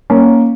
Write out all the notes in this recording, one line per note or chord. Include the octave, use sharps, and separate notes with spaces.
A#3 C#4